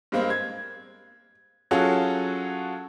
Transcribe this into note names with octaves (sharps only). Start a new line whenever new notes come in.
G2 G#3 A#3 C4
G#6
F#3 C#4 F4 F#4 G#4 A4